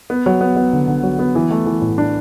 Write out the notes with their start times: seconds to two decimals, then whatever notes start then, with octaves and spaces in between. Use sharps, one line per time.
0.10 B3
0.26 F#3
0.41 B3
0.56 B3
0.73 D3
0.88 D3
1.03 F#3
1.19 B3
1.35 E3
1.51 A3
1.66 E3
1.81 A2
1.98 D4